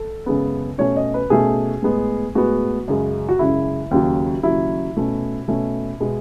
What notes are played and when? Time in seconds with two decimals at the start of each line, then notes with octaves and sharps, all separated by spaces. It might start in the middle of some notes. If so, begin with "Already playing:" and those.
Already playing: A4
0.26 F#2 C#3 G#3 B3
0.78 B2 A3 C#4 C#5
0.96 D#5
1.14 B4
1.30 B2 A3 C#4 G#4
1.82 A2 G#3 B3
2.35 A2 G#3 B3 F#4
2.88 F#2 C#3 G#3
3.29 F#4
3.39 F#2 C#3 G#3 E4
3.91 D#2 C#3 F#3
4.43 D#2 C#3 F#3 E4
4.97 B2 A3 C#4
5.48 B2 A3 C#4
6.01 B2 G#3 B3